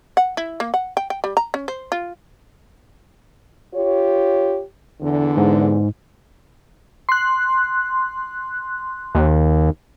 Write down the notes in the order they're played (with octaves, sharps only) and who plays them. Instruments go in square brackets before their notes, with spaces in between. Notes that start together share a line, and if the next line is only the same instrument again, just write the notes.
[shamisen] F#5
E4
A#3
F#5
G5
G5
G3
A#5
C#4
C5
F4
[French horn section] F4 G4 C#5
E2 D3
[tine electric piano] G#2
[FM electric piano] C6 F#6
[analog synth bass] D#2